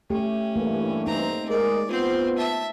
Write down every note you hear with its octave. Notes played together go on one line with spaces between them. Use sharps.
A3 C#4 G4
G2 E3 A3 A#3
C4 D#4 A#5
G#3 A#4 D5
B3 C4 F4 C5
E5 A5